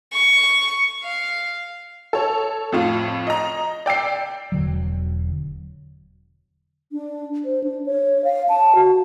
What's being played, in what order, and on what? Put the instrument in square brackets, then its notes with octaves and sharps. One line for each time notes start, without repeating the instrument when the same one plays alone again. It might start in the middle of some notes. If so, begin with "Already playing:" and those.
[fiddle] C#6
F5
[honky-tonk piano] A4 C#5
F2 A2 F4
D#5 A#5
D5 G5 E6 C7
[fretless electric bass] E1 D3 F#3
[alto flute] D4
C5
D4
C#5
F5
A5
F#4